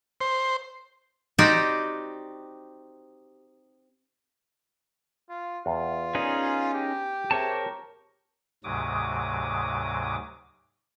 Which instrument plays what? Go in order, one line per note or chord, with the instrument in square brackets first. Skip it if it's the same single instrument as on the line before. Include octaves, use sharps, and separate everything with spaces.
[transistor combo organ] C5
[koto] C4 D#4 F#4 G4 C5 D5
[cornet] F4
[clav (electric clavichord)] E2 [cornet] F4
[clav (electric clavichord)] B3 A#4 D5 [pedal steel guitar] C#4 D#4 G#4
[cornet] G4
[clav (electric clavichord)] C4 G#4 E5 [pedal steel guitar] A#4 C#5 A5
[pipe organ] D2 G#2 C3 F#3 D6 D#6